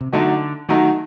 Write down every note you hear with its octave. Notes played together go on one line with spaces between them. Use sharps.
C3
D3 F#3 A3 D#4 F#4
D#3 F#3 A3 D#4 F#4